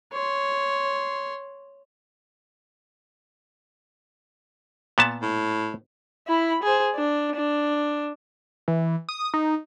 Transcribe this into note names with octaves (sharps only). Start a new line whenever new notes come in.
C#5 C6
A#2 B3 A5
A2
E4 B5
G#4 C5
D4
D4
E3
D#6
D#4